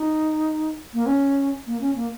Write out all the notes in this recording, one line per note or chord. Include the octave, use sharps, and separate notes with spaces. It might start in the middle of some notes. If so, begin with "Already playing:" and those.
Already playing: D#4
A#3
C#4
A#3
C#4
A#3